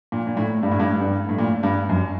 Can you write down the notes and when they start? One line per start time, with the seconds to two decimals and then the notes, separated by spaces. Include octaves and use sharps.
0.12 A#2
0.27 A#2
0.37 A2
0.63 G2
0.71 A2
0.80 G2
1.01 G2
1.29 A2
1.39 A#2
1.63 G2
1.89 F#2